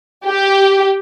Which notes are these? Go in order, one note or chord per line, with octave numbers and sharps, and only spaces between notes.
G4